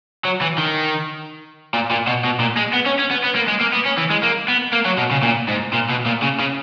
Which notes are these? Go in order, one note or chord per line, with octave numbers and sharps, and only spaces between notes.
F#3
E3
D#3
A#2
A#2
B2
B2
A#2
G#3
B3
C#4
C#4
B3
B3
A#3
G#3
A#3
B3
C#4
E3
G#3
A#3
B3
A#3
F#3
B2
C#3
A#2
G#2
A#2
B2
A#2
C#3
C#3